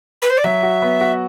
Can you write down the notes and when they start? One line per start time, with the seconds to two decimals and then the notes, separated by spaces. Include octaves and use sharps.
0.22 B4
0.30 C5
0.38 D5
0.44 F#3 E5
0.63 F#4
0.82 B3
1.01 F#4